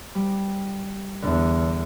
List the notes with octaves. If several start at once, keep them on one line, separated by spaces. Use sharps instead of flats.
G3
E2 D3